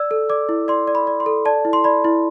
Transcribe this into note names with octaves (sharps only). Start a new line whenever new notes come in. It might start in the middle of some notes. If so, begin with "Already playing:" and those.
Already playing: D5 E6
A4
D5 D6
E4
D5 C6
D5
B5
D5
C6
A4
D5 A5
E4
C6
D5 B5
E4